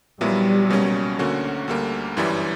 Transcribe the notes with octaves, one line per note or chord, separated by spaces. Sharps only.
A#1 A#2 F#3 G3 B3 E4
C#2 B2 F#3 A#3 C#4
D2 D3 A#3 C#4 F#4
D2 D3 G3 A#3
G1 F#2 E3 G3